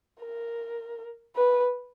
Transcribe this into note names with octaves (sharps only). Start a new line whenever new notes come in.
A#4
B4